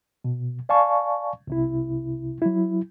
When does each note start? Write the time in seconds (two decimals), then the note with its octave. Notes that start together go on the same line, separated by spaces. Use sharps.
0.24 B2
0.69 D5 F5 G#5 A5 C#6
1.47 C2 C3 E4
2.42 F#3 E4